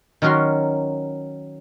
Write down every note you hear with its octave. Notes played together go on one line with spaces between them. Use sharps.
D#3 F#3 C#4 F#4 A#4 C6